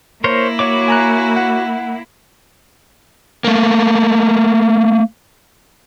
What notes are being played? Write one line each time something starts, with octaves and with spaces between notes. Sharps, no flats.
A#3 E4 A#4 C5 C#5
F#4 C#5 D6
G#5 A#5 F#6
F#5
A3 A#3